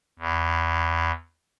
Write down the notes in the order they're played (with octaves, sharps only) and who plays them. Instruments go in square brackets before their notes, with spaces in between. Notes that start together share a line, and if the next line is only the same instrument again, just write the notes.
[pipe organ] E2